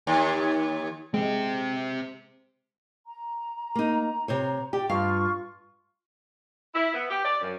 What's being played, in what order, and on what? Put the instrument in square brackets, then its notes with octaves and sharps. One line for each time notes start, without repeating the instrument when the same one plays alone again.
[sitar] D#2
[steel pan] G#3 [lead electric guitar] C4 G4
[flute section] A#5
[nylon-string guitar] A#3 D#4
C3 C5 C#5
[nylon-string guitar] G4 [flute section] D5 G5
[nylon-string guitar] G2 F5 [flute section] F4 C#6
[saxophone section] E4
B3
G4
D5
F#2